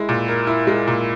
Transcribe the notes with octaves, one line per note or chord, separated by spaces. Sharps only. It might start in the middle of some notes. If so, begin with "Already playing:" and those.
Already playing: G#3 E4
A#2
A#4
E4
G#3
A#2